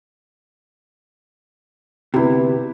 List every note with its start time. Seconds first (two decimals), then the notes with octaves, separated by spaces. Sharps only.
2.14 D2 C3 B3 E4 G4